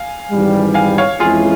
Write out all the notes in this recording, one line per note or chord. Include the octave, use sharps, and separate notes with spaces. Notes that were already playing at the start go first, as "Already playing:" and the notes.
Already playing: F5 G#5
G#1 G#2 E3 G3
F5 G#5
C#5 F5
F2 E3 G#3 C#4 E4 F4 G#4